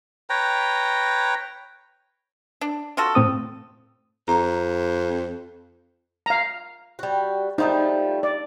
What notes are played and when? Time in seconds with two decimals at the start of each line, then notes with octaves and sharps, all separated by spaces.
0.30 B4 C#5 G5 A#5
2.61 D4
2.97 F4 F#4 A4
3.15 A2 C4 D#6
4.28 F2 A#5
6.26 F5 A#5
6.99 G3 F#4
7.58 F3 G3 A3 D#4
8.23 D5